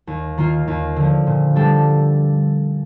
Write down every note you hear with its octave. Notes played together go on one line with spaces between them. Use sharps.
D#2
D#3 A#3 F4
D#2
D3 F3
A#2
G3 D4 A4